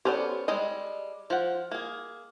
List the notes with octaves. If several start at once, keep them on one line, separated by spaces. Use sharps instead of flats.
B3 C#4 G4 A4 C5 D5
G3 G#3 A4 D#5
F3 F#5
A#3 G#4